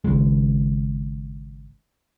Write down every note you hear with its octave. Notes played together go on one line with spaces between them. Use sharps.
G#1 D#2 C#3 G#3